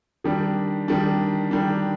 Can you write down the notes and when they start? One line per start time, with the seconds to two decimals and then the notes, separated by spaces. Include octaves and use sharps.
0.24 D#3 G3 D4
0.88 D#3 G3 D4
1.51 D#3 G3 D4